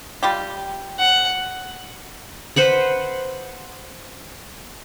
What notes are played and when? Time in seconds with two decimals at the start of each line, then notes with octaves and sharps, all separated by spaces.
0.23 G3 F4 G4
0.99 F#5
2.56 B4 C5 F#5 B5